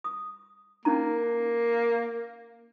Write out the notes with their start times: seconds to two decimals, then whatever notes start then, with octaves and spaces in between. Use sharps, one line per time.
0.04 D#6
0.85 A#3 C#4 D#4 A#5